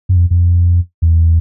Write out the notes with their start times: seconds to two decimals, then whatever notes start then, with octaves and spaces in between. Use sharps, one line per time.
0.09 F#2
0.16 F2
0.30 F2
1.02 E2